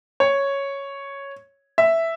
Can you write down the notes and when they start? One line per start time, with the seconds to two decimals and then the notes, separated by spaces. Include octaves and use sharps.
0.20 C#5
1.78 E5